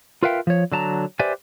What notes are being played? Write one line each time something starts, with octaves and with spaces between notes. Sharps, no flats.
F4 A#4 B4 E5 F5 G5
F3 C#5
D3 F#3 A5 A#5
G4 B4 C5 D5 E5 G#5